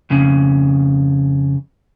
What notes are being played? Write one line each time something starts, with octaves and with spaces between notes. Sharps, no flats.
F2 C#3